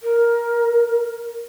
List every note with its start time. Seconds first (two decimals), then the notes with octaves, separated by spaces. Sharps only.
0.02 A#4